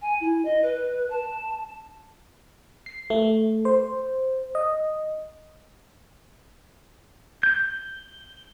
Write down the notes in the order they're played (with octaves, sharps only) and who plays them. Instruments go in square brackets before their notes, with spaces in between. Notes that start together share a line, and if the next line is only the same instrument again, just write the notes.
[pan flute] G#5
E4
D#5
B4
A5
[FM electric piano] C7
A3
C5
D#5
[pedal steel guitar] G6